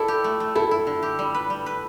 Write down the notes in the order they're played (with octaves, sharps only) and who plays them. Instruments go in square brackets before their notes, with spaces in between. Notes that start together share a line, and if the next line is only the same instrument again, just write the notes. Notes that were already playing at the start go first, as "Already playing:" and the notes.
Already playing: [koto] E4 D5 [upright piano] A4
[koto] G4
A3
A3
[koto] E4 [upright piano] A4
[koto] E4
D3
G4
G3
B4
G3
B4